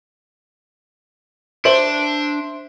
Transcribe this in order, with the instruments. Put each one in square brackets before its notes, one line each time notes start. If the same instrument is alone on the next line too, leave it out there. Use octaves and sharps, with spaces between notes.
[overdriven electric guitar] D4 [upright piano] C5 E5 F#7